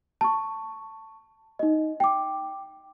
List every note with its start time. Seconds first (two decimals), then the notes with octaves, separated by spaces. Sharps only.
0.21 A5 C#6
1.59 D#4 D#5
2.00 G5 D6